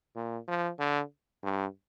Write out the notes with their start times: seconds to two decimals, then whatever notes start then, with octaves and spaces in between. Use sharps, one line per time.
0.15 A#2
0.48 F3
0.79 D3
1.43 G2